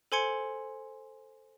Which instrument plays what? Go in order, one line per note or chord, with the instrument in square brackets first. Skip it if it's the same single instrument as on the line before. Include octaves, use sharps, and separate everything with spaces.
[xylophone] A4 C5 G#5 C6 G#6 C#7